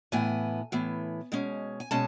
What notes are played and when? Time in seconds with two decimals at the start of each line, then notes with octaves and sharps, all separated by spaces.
0.12 A2 E3 B3 G#5
0.72 A2 E3 B3
1.32 B2 G#3 C#4
1.80 G#5
1.91 B2 G#3 C#4 A5